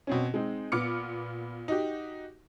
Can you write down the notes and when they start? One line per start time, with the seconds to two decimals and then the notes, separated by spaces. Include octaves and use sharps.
0.07 B2 C4 C#4
0.34 G#3 C4 D#4
0.72 A#2 B3 D6 F6 C#7
1.68 D#4 F#4 G4